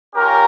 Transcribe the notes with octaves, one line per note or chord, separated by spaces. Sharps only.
C#4 F4 G4 A#4